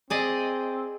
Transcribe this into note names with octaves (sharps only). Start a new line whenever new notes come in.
C4 G#4 D5 D#5